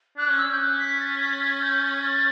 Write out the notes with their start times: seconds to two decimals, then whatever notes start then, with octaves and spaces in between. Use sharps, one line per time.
0.17 D4 F#6
0.30 C#4
0.37 E6
0.52 C#4 G6
0.59 F#6
0.79 B6
0.99 A6
1.20 B6
1.40 A6
1.61 G6
1.81 A6
1.93 G6
2.02 A6